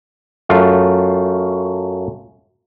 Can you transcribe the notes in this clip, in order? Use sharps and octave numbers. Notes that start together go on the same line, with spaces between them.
F#2 A3 F4